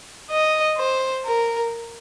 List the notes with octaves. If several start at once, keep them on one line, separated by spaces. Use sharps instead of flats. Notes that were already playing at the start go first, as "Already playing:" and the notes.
D#5
C5
A#4